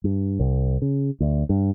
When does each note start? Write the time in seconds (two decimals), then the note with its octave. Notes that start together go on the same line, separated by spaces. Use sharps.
0.04 G2
0.39 C2
0.82 C#3
1.20 D2
1.49 G2